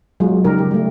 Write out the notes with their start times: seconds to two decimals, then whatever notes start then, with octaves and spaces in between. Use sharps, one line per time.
0.20 F#3 G#3 B3 F4 G#4
0.45 C#3 G3 D#4 G4 A#4
0.58 G4
0.71 G3 A3